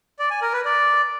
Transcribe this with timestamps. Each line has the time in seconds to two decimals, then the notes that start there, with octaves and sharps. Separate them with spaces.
0.19 D5
0.31 G#5
0.42 A#4
0.54 B4
0.65 D5